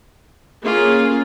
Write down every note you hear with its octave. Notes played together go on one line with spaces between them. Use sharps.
A#3 C#4 F4 G#4